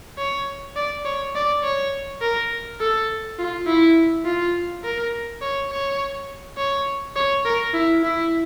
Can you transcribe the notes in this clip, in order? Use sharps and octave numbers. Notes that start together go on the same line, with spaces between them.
C#5
D5
C#5
D5
C#5
A#4
A4
F4
E4
F4
A#4
C#5
C#5
C#5
C#5
A#4
E4
E4